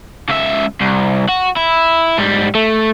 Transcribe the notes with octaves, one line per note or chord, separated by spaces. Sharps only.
C#2 E5
C2
F#4
E4
G#2 G3
A3